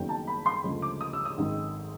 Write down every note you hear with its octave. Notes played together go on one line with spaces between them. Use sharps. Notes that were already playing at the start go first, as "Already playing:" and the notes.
Already playing: F#1 F#2 D#3 F#3 B3 G5
A5
B5
C6
D2 C#3 F3 G#3
D6
D#6
E6
D#6
G#1 F#2 D#3 G#3